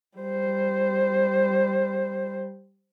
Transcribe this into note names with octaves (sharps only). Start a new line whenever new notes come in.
G3 C5